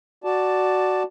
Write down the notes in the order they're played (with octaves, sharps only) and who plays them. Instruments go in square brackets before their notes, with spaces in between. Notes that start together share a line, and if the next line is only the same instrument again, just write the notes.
[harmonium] F#4 D5 A5